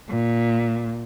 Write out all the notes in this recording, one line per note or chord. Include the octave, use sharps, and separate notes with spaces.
A#2